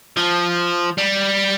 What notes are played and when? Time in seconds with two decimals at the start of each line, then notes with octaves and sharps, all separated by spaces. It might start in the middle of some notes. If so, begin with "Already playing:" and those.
0.17 F3
0.98 G3